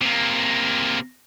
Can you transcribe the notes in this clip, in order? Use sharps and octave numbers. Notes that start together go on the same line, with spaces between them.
C3 A#3